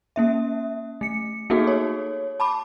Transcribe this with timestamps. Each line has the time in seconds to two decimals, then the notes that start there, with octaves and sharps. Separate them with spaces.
0.16 A#3 C#4 E5
1.01 A3 C#7
1.50 A#3 B3 D#4 F#4 G#4 A4
1.67 C#5
2.40 A5 B5 D6